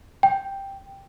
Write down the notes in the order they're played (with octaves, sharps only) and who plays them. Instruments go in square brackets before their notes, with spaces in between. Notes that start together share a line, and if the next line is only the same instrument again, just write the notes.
[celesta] G5